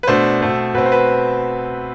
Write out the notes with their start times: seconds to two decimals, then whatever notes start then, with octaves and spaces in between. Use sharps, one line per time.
0.03 B4
0.07 B2 A3 D4 C5
0.41 B2 A3 C4
0.74 B2 A3 C4 B4
0.86 C5
0.92 B4